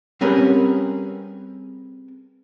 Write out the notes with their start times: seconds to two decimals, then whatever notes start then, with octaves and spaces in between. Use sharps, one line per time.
0.21 G3 C4 C#4 G#4 A#4 B4